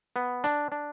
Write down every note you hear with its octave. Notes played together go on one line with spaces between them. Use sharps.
B3
D4
D4